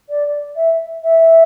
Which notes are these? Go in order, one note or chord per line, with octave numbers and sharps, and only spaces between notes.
D5
E5
E5